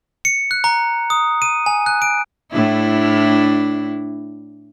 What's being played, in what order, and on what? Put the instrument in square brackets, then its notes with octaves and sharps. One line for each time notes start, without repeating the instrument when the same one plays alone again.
[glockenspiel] C#7
F#6
A#5
D#6
D#7
G#5
F#6
D7
[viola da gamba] A2 D4 E4